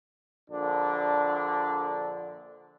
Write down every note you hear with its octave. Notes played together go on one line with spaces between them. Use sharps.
A#1 D3 D4